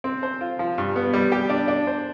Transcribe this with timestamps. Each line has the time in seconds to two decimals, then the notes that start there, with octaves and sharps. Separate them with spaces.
0.04 C4
0.23 C5
0.41 F4
0.59 F3
0.78 G2
0.96 B3
1.13 G3
1.32 G4
1.50 D4
1.68 D4
1.87 C5